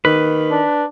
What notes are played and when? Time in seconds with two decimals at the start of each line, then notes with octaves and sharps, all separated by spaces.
0.05 D#3 B4
0.51 D4